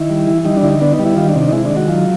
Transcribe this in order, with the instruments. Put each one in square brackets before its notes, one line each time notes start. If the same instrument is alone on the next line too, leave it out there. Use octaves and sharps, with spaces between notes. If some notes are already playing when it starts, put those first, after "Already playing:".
Already playing: [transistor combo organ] D#3 E4
G3
E3
G3 D#4
D4
D3 E4
D#4
B3 D4
D#4
G3
E4
D#3 F4
D4
C3
D4
D#4
G#3 E4
D4
D#3
F#4
F#3 F4